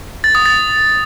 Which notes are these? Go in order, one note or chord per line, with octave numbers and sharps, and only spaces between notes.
A6
D#6
A6